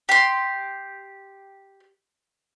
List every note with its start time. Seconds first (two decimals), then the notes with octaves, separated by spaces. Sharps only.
0.09 G4 C6